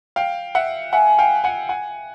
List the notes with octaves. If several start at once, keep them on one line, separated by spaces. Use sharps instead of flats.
F5 G5
E5 F#5
E5 F#5 G#5
F5 G5
F#5 G#5
F#5 G#5